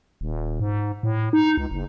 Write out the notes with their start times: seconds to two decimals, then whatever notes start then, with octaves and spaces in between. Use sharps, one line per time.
0.21 D#1
0.60 G#2
1.03 A2
1.33 D#4
1.57 C#2
1.71 F#1